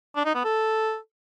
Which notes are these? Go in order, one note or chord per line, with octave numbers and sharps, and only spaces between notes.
D4
D#4
B3
A4